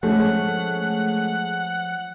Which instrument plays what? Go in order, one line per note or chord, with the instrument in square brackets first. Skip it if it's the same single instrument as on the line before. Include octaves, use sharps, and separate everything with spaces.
[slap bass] F3 [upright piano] G#3 C#4 [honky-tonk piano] A3 [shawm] F#5